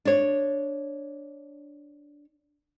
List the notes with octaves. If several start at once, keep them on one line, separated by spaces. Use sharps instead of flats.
D4 C#5